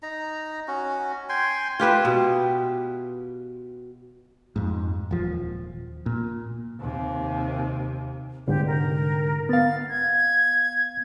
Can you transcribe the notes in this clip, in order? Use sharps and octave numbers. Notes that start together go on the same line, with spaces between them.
D#4 A#5
C#4 F#4
G5 G#5 C6
F4 G4 B4 E5
B2
F2 G#2
D#1 F3
A#2
D#2 C3
C2 G#2 D3 G4
A#4
B3 F5 A6
G#6